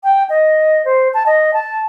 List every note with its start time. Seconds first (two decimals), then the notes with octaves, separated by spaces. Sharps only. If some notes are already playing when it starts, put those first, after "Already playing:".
0.03 G5
0.29 D#5
0.85 C5
1.14 A5
1.26 D#5
1.53 A5